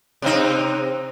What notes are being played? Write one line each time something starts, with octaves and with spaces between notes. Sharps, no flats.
C3 C4 D#4